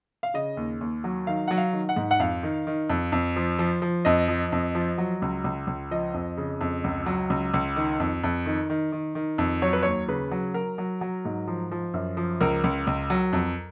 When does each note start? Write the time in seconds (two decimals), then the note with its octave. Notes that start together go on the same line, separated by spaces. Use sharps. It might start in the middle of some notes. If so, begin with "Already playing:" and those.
0.23 F5
0.34 C#3 D#5
0.57 D#2
0.81 D#2
1.04 F#3
1.27 D#3 F5
1.48 F#3 F#5
1.58 F5
1.73 D#3
1.89 F#5
1.96 G#2
2.11 F#5
2.20 F2 F5
2.43 D#3
2.67 D#3
2.90 F2
3.12 F2
3.36 F3
3.59 F3
3.82 F3
4.05 F2 D#5
4.28 F3
4.52 F2
4.75 F3
4.98 F#3
5.22 C#2
5.44 C#2
5.67 C#2
5.91 F3 D#5
6.14 F2
6.37 C#3
6.61 F2
6.84 C#2
7.06 F#3
7.30 C#2
7.54 C#2
7.76 D#3
8.00 F2
8.24 F2
8.46 D#3
8.70 D#3
8.92 D#3
9.15 D#3
9.38 F2
9.62 F#3 C#5
9.73 B4
9.83 D#2 C#5
10.08 C#3 B4
10.31 F#3
10.54 F#3 A#4
10.78 F#3
11.01 F#3
11.25 G#2
11.48 F3
11.72 F3
11.94 F#2
12.17 F3
12.40 C#2 A#4
12.64 C#2
12.87 C#2
13.10 F#3
13.33 F2